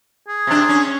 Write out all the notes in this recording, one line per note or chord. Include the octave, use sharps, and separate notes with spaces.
G#4
C3 D4
C#4